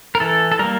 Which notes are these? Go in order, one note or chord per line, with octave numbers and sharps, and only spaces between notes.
A#4
E3 A4
A4
G3 A#3 A#4